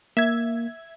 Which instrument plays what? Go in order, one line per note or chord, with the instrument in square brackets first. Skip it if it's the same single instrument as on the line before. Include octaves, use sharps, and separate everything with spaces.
[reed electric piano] A#3 [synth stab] E5 G#6